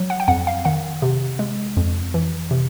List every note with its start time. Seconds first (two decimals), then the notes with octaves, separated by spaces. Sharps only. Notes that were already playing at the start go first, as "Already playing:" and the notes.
Already playing: F#3
0.10 F#5
0.20 G5
0.28 F2 F#5
0.47 F5
0.65 D#3 F#5
1.02 C3
1.39 G#3
1.77 F2
2.14 E3
2.51 C3